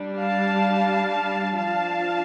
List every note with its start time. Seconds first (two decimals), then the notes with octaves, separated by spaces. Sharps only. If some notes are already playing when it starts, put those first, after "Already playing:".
Already playing: G3 D4
0.19 F5 A5
1.57 F3 D4 F5 A5